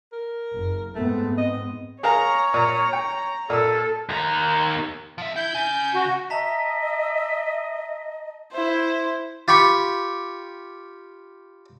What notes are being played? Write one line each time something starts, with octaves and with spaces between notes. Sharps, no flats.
A#4
F#1
G#2 A3 B3 C4
D#5
G#4 A#4 C#5 F5 A#5
A#2 A#5
G5
A#2 A4 E6
D#2 A#5
F3 E5
E4 G6
C#3
F#4
D#5 E5 A5 A#5 B6
E4 C5
F4 G4 B5 C#6